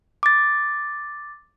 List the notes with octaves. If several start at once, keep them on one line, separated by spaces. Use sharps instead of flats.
D6 A6